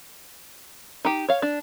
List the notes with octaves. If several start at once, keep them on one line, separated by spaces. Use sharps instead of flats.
D#4 G4
C#5 F5
D4